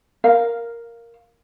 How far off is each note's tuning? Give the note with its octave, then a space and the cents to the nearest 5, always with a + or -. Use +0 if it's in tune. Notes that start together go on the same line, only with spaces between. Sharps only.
A#4 +0 F5 -5